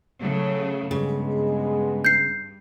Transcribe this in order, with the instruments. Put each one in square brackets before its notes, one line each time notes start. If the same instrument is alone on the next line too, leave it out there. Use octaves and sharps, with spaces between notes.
[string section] C#3 F#3 A3
[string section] G2 [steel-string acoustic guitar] C#3 [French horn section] G#3 B3
[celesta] G6 C7